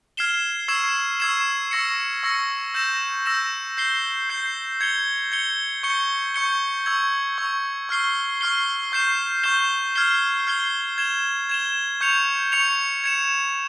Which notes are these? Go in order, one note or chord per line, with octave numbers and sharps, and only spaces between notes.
F6 G#6 C7 E7 G7
C#6 E6 G#6 C7 E7
C#6 E6 G#6 C7 E7
C#6 E6 A#6 C#7
C#6 E6 A#6 C#7
E6 G6 A#6 E7
E6 G6 A#6 E7
G6 C7 G7
G6 C7 G7
G#6 C#7 G7
G#6 C#7 G7
C#6 G6 C#7 G7
C#6 G6 C#7 G7
C#6 E6 G#6
C#6 E6 G#6
C#6 F6 C7 G7
C#6 F6 C7 G7
C#6 G6 C7 E7 G7
C#6 G6 C7 E7 G7
F6 G#6 C7 G7
F6 G#6 C7 G7
G#6 E7 G7
G#6 E7 G7
C#6 G6 C#7 F7
C#6 G6 C#7 F7
G#6 C#7 E7